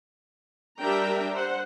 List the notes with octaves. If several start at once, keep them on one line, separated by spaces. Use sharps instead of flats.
G3 D4 A#4 E5 G5 A#5
C5 F#5